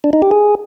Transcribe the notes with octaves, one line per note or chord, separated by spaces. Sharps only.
D4
D#4
G4
G#4